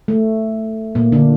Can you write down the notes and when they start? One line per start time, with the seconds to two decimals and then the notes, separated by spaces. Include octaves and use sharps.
0.08 A3
0.95 A#2 A#3
1.12 D3 D4